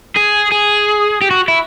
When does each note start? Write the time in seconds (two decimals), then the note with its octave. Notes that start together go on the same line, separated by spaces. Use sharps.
0.17 G#4
0.52 G#4
1.21 G4
1.31 F#4
1.48 E4